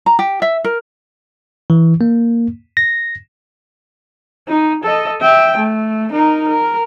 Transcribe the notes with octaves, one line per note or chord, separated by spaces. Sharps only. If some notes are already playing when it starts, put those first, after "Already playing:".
A#5
G4
E5
A#4
E3
A#3
A#6
D#4
A4 D#5
E5 G5
A3
D#4 A#4
A#4